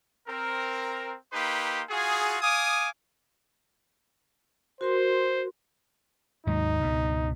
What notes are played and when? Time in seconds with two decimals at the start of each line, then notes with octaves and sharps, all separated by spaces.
0.28 C4 A#4
1.32 A#3 D#4 G4 B4 C6
1.89 F4 F#4 G#4
2.41 F5 G#5 D6 D#6
4.81 F#4 A#4 C5 C6
6.47 D#2 G#2 F#3 D#4
6.81 C#2 G2 B2